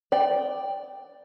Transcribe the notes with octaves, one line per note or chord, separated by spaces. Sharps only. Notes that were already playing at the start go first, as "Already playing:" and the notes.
D5 G5